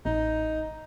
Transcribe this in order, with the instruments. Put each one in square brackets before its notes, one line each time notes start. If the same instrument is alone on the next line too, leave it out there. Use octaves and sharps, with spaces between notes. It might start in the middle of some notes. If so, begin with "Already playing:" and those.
[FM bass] A1 [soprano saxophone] D#4